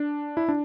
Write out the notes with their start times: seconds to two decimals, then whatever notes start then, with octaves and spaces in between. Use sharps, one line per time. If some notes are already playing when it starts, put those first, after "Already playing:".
Already playing: D4
0.37 E4
0.49 D4